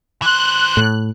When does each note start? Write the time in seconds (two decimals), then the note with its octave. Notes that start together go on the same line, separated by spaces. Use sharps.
0.22 E3 C5 F#6
0.77 A2